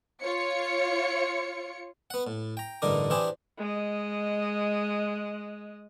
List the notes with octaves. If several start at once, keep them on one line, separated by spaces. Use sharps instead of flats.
F4 C#5 C#7
B3 F#5
A2
G5 A#5
A1 G2 D3 D#4 A#4 D6
E3 D4 E4 G4 G#4 C5
G#3 D#5